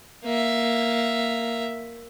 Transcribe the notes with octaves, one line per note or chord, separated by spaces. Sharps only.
A#3 E5